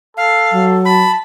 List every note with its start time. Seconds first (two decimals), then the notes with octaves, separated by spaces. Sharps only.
0.17 A4 F5
0.52 F#3
0.85 A5 B5